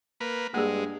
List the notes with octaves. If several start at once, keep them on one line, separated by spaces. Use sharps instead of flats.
A#3 B4
G2 G#3 A#3 G#4